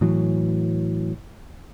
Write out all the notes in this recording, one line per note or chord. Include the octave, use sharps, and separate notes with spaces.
A2 E3 F#3